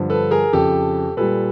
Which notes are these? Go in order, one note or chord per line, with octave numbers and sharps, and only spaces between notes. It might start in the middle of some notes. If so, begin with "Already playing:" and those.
Already playing: G2 D3 F3
A4 B4
G#4 A#4
F2 C#3 F3 G4 A4
A#2 G3 A4 B4